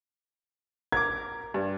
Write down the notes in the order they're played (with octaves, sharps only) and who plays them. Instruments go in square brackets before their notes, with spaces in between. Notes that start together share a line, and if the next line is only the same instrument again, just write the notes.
[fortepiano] A#4 D6 [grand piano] G#6
[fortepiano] G2